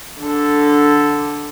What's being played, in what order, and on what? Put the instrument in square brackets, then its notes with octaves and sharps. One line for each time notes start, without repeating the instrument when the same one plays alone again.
[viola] D3 A4